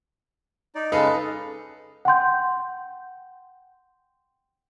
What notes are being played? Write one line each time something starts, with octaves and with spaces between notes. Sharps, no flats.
D#4 D5
C#3 G#3 D#4 A4 B4 F5
F#5 G5 C6 G6